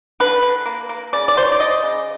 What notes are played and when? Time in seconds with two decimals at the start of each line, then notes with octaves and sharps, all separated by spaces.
0.20 D3 B4
0.43 D3
0.66 A#3
0.89 A#3
1.13 C#3 D5
1.28 D5
1.36 F#3 C5
1.45 C#5
1.52 D5
1.59 F#3 D#5
1.83 C#3